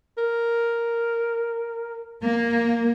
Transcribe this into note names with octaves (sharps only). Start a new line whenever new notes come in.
A#4
A#3